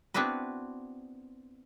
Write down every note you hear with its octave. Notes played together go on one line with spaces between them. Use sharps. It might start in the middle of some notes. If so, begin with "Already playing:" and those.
B3 C4 D4 E4 F#4 B4